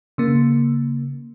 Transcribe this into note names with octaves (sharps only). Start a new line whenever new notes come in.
C#3 A#3